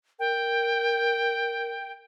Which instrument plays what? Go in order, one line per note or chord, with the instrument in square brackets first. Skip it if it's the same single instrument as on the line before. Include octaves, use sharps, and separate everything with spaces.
[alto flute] A#4 [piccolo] G5